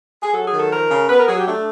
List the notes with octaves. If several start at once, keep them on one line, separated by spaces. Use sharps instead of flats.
G#4
F#3 A4
G#4
D#3
A4
F3 A#4
C#3
B3 B4
A#4
F#3 G#4
G4
A3 D4